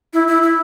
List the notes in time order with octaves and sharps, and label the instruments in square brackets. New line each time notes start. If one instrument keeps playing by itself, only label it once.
[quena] E4
E4
E4